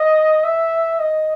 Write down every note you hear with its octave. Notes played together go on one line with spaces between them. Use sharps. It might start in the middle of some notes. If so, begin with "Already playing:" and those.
Already playing: D#5
E5
D#5